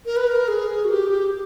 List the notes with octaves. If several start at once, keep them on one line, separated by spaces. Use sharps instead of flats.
A#4
B4
A#4
G#4
F#4
G4